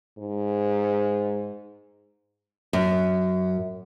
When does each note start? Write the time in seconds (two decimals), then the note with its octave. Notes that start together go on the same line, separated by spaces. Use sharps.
0.18 G#2
2.73 F#2